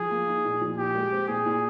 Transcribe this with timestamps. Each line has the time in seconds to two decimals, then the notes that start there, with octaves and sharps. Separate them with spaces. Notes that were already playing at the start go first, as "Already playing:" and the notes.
Already playing: F3 G#4
0.11 A#3
0.28 D#4
0.45 A#2
0.61 F3
0.78 A#2 G4
0.95 G#3
1.12 C4
1.28 A#2 G#4
1.46 A#2